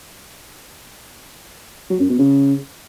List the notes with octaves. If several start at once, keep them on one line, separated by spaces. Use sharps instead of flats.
F#3
F#2
B2
C#3